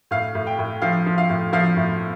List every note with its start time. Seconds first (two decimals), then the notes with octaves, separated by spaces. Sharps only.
0.11 A2 F5
0.35 A2
0.47 G5
0.59 A2
0.82 F3 F5
1.06 F3
1.18 F5
1.29 A2
1.53 F3 F5
1.77 A2